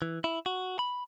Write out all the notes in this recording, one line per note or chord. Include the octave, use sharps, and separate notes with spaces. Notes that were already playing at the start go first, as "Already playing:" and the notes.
E3
E4
F#4
B5